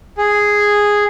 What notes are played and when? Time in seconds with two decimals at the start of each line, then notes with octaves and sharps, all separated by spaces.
0.18 G#4